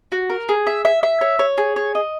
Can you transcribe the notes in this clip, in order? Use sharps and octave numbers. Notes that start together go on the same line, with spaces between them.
F#4
A#4
G#4
E5
E5
E5
C#5
C#5
G#4
C#5
D#5